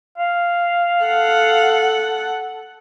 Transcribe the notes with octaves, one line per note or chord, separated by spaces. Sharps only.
F5
A4 F#5